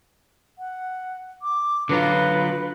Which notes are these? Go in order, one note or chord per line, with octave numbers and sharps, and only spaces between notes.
F#5
D6
D3 F#3 F4 B4